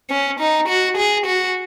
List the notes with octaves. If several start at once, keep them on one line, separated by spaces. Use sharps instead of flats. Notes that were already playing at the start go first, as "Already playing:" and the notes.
C#4
D#4
F#4
G#4
F#4